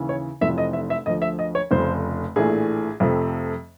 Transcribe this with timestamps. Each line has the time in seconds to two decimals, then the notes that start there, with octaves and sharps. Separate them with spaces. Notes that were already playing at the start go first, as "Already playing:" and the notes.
Already playing: D#2 C#3 E3
0.09 C#5
0.41 F1 F2 C3 E3 E5
0.58 D#5
0.73 E5
0.90 E5
1.06 D2 D3 F3 D#5
1.22 E5
1.39 D#5
1.55 C#5
1.71 F1 F2 C#3 C5
2.36 A#1 A2 E3 A3 G#4
3.00 F2 C3 F3 A3